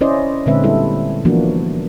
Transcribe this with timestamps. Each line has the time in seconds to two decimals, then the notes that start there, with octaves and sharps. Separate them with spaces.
0.01 C#4 E4 C5 D5 D#5
0.46 A#2 D3 G#3 C4 B4 E5
0.63 G3 E4 A4
1.25 E3 F3 A#3 B3 D4 F#4